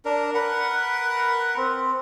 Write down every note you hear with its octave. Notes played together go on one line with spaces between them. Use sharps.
D4 A#4
A#4 B4 F#5
C4